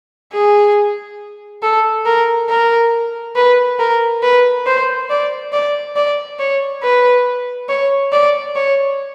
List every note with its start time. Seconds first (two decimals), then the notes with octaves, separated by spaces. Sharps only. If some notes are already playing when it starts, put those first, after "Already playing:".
0.33 G#4
1.63 A4
2.06 A#4
2.49 A#4
3.36 B4
3.79 A#4
4.22 B4
4.66 C5
5.09 D5
5.53 D5
5.96 D5
6.39 C#5
6.82 B4
7.69 C#5
8.12 D5
8.56 C#5